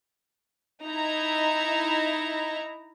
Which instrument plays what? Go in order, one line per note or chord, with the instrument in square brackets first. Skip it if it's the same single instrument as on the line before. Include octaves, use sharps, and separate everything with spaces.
[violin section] D#4 E4 A#5